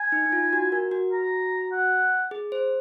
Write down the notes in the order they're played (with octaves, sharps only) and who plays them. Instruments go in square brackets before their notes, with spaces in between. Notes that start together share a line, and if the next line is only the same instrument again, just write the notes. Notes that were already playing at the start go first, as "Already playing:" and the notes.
Already playing: [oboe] G#5
[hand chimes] D#4
D#4
F4
F#4
A#4
F#4
[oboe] A#5
F#5
[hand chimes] G#4
C5